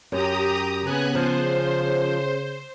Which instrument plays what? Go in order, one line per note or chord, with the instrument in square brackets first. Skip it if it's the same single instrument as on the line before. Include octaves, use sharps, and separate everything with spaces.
[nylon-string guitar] F#2 [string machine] G4 A#5 D#6
[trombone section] C#3 [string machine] B3 G#5 F#6
[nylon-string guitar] F3 [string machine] C5